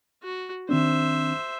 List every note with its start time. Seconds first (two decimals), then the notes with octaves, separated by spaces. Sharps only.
0.23 F#4
0.69 D#3 C4 D4 C5 E5